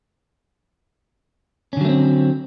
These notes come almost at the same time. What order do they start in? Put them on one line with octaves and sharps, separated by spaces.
C#4 D3 F#3 A3 C4